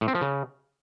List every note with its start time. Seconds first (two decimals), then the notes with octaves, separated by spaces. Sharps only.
0.01 A2
0.08 C4
0.15 F3
0.21 C#3